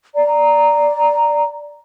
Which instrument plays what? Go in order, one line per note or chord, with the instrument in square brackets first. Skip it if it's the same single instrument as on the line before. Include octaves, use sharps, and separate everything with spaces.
[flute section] D5 A#5